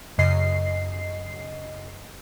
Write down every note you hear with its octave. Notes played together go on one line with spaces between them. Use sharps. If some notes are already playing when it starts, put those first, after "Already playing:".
F#2 C#3 D#5 C7